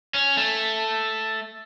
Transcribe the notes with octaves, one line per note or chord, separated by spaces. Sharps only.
C#4
A3